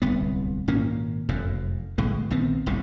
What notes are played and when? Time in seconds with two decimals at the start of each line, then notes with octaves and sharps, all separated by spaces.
0.02 D1 C2 B3
0.68 G#1 A#2 A#3 C#4
1.29 F1 F#2 A2
1.98 B1 A2 D3 G#3
2.30 A#1 D#3 B3 C4
2.66 F#1 C2 G#2 C#3